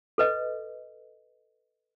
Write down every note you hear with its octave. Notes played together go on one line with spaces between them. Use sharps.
A4 B4 D#5